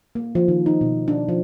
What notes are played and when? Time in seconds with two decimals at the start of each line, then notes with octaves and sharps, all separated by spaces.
0.15 A#3
0.35 F3
0.48 D#3
0.66 D#4
0.81 B2
1.08 D4
1.29 F3